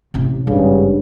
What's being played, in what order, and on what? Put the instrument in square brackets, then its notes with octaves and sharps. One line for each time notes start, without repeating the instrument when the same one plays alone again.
[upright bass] A1 C3
[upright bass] G#1 [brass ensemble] G2 C#3